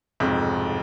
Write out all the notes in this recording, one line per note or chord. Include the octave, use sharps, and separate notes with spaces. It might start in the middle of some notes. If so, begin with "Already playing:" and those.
D1 B1 F2 G#2 C3